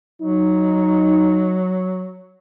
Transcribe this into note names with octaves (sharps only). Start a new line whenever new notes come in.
F#3 D#4